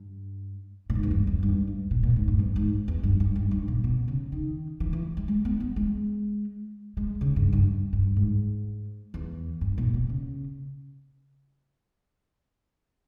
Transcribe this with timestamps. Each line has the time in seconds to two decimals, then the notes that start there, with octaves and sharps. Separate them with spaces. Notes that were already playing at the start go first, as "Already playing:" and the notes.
Already playing: G2
0.90 A#2
0.95 G#2
1.03 E2
1.11 G2
1.27 E2
1.43 G2
1.68 G2
1.91 A#2
2.03 A#2
2.16 G#2
2.28 G2
2.39 E2
2.56 G#2
2.88 E2
3.03 G2
3.20 G2
3.36 G2
3.51 G2
3.68 A#2
3.84 B2
4.08 C#3
4.32 D#3
4.80 E3
4.93 E3
5.17 G3
5.28 G#3
5.45 B3
5.60 B3
5.76 G#3
6.97 G#3
7.21 C#3
7.36 G2
7.53 G2
7.93 G2
8.16 G#2
9.14 E2
9.61 G2
9.78 A#2
9.94 B2
10.09 C#3